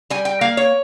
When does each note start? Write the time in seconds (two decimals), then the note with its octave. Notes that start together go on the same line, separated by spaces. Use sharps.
0.10 G3 G#5
0.25 G5
0.41 A#3 F5
0.57 C#5